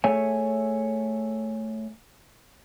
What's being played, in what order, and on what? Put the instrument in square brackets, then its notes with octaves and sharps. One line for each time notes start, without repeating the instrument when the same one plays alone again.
[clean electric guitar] A3 G#4 A4 C#5 E5 G#5